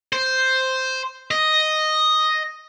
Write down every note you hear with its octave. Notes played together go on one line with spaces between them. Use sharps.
C5
D#5